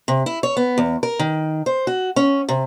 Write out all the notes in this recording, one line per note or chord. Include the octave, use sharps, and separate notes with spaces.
C3
E4
C#5
B3
E2
A#4
D#3
C5
F#4
C#4
C3